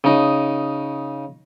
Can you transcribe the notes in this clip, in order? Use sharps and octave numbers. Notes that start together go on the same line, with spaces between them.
C#3 D#4